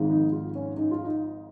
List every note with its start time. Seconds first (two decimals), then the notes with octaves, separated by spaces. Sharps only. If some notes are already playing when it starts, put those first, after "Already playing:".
Already playing: G#1 G#2 F3
0.10 D#4
0.32 F4
0.55 C#4
0.77 D#4
0.91 F4
1.04 D#4